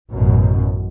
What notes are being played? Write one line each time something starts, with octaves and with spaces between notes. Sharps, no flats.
A1 F#2 B2